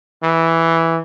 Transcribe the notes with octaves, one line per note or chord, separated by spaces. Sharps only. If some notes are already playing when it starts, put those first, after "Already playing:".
E3